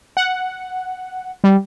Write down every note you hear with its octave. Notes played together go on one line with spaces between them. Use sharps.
F#5
G3